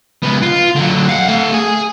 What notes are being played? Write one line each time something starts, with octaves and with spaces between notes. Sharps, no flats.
C#2 B3
F4
D3 F#3
F5 F#5
A3 F5
G#4 G#5